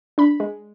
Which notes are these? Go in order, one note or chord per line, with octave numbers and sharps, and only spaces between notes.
D4 B5
G#3